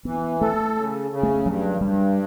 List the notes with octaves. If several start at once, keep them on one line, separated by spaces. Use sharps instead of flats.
E3 B3
A3 A4
C#3
C#3
A3
G2 F#3
G2 G3